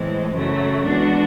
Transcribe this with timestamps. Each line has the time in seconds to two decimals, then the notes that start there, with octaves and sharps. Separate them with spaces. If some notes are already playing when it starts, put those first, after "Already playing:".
Already playing: A2 E3 G#3 C4
0.32 F#2 C#3 F#3 A3
0.85 E3 G#3 B3 D4 F#4